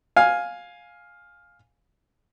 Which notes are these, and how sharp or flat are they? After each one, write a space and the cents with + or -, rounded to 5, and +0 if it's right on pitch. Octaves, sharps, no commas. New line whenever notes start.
F5 +10 G#5 +0